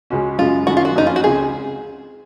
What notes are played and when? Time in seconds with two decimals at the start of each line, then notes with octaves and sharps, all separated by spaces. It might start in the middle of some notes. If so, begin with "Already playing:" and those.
0.10 C#2 C#3 G#3 C#4 F#4
0.38 F#2 C#3 G#3 F4
0.67 F#2 D#3 G#3 C#4 F#4
0.77 F4
0.85 F#4
0.95 F#1 F2 C#3 G#3 C#4 D#4
1.07 F4
1.16 F#4
1.24 C#2 C#3 G#3 C4 G#4